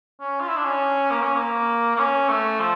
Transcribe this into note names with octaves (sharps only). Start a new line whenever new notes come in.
C#4
F4
E4
D4
C#4
A#3
C#4
A#3
A#3
C#4
A3
F3